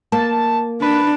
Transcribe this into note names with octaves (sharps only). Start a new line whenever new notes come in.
A#3 A5
D4 B4